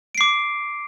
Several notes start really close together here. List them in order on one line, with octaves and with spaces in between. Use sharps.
D7 C7 D6